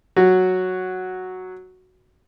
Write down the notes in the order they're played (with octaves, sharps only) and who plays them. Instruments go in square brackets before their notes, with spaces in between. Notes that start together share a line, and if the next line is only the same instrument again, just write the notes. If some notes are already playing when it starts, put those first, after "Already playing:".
[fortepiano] F#3 F#4